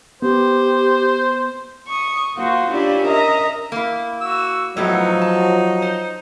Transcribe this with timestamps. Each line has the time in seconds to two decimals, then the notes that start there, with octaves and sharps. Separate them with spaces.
0.22 B3 G4 C5
1.88 C#6 D#6
2.35 A#3 F4 F#4 C5
2.69 C#4 D4 E4 F4 G4 D5
3.05 A#4 D#5 E5 A#5
3.72 A#3 E4
4.21 F#4 E6
4.77 A2 F3 F#3 A3 B3 D#4
5.21 A5
5.82 C5